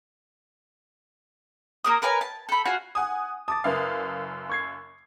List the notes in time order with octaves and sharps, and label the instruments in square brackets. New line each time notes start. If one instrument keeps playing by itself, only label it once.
[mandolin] A#3 A#4 D#6
A#4 B4 C#5 G#5
A5
A4 B5
F4 F#4 F#5 G#5
[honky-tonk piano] F#5 G#5 D#6
[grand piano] A5 D6 A6 [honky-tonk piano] D#6
[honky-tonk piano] F#1 F#2 F5 [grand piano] A#4 B4 E5
[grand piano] C#6 G#6 C7